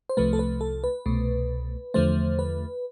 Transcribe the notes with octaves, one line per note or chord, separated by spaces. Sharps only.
C5
C2 C3 F3 A3 B4
A4
B4
A4
B4
C2 B2 A3
E2 D3 F3 A3 C5
B4